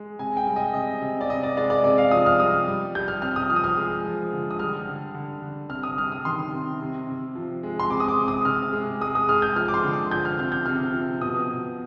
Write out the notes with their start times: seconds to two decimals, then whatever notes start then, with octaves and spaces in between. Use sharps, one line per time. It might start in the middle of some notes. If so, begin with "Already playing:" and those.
Already playing: G#3
0.19 C3 G#5
0.37 G5
0.47 G3
0.56 D#5
0.74 C3 D#5
1.02 C3
1.21 D5
1.29 C3 D#5
1.43 D5
1.57 G#3 D5
1.70 D5
1.84 C3 D5
1.98 F5
2.11 F3 D#6
2.26 F6
2.39 G3 D#6
2.68 G3
2.95 G3 G6
3.08 F6
3.22 C3 F6
3.36 D#6
3.49 F3 F6
3.56 D#6
3.64 F6
3.77 G#3
4.05 F3
4.33 D3
4.51 D#6
4.59 G3 F6
4.87 D3
5.14 D3
5.42 D3
5.70 C3 F6
5.83 D#6
5.98 G3 F6
6.12 D#6
6.25 D#3 C6
6.52 C3
6.81 C3
7.09 C3
7.35 F3
7.63 G#3
7.80 C6
7.90 C3 D6
8.00 D#6
8.08 D6
8.18 C3
8.28 D#6
8.45 C3 F6
8.73 G#3
9.01 G#3 D#6
9.15 D#6
9.29 G#3 F6
9.42 G6
9.56 F3 F6
9.68 D6
9.74 C6
9.83 D3
9.93 D6
10.11 F3 G6
10.25 F6
10.38 C3 F6
10.52 G6
10.66 C3 F6
10.93 F3
11.21 B2 D#6
11.49 B2